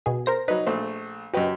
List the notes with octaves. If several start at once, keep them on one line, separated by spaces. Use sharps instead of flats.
B2 G#4
A#4 C5 A#6
F#3 D#4 B4
A#1 A3 C5
F#2 F#4 G4 B4 D#5